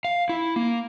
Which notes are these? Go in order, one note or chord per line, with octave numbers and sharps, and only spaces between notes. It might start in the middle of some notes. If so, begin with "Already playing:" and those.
F5
E4
A#3